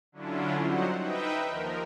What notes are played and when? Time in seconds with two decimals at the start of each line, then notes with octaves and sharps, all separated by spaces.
0.12 D3 F#3 C#4 D4 E4 F4
0.60 F#3 G3 D#4 C5 F#5
1.00 D#4 B4 D#5 E5 G5
1.45 D#2 F3 A#4